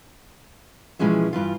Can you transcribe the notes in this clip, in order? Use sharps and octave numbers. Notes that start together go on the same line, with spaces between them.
B2 E3 F3 G#3 C#4 E5
G2 E3 F4